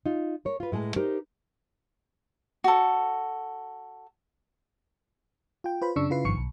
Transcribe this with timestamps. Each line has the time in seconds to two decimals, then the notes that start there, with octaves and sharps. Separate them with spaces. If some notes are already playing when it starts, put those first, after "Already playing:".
0.06 D#4 F4
0.45 A#4 C#5
0.60 F4 B4
0.72 A2 G#3 G#4 A5
0.96 D#4 G4 A#4 C5
2.64 F#4 A4
5.64 F4 G5
5.82 F4 B4 C5 B5
5.96 F#2 C#3 D4 C#6 E6
6.10 C#3 E4 F4 B4 C7
6.25 G#1 G2 D#3 F3 C#6 C#7
6.37 B1